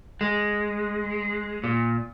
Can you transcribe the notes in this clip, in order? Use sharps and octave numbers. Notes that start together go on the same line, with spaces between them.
G#3
A#2